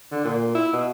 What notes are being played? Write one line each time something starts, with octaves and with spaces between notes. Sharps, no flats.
D3
A#2
E4
B2